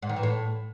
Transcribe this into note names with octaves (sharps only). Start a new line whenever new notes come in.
G#2
D#3
E3
A2